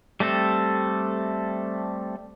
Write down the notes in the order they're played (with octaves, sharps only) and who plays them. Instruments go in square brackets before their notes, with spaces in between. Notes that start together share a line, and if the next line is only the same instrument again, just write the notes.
[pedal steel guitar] G3 A3 C4 A4